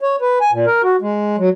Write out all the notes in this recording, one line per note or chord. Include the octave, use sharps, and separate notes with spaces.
C#5
B4
G#5
A#2
A#4
F#4
G#3
F#3